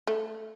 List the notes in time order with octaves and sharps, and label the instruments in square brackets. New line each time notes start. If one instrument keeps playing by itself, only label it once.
[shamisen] A3